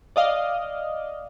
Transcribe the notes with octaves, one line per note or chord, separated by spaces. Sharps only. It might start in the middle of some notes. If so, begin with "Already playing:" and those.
D5 D#5 F5